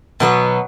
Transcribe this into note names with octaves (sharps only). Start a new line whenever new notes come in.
B2 F#3 B3